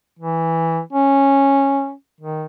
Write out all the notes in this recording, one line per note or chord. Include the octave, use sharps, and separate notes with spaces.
E3
C#4
D#3